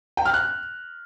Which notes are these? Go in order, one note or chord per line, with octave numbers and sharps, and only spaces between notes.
G5
F6
F#6